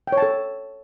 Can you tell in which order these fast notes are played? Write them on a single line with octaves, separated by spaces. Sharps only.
G5 C#5 A5 A4